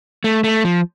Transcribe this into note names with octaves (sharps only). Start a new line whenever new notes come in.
A3
A3
F3